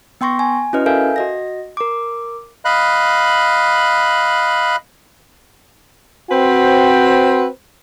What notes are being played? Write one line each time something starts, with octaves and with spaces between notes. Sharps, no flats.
B3 G5 C6 C#6 A#6
G#5
C#4 E4 F#4 B4 D#5 F6
A4 A#4 E5 F5 G#5 G6
F#4 D#5 A#6
A#4 D6
D#5 F5 B5 F#6
C4 F#4 B4 C5 G5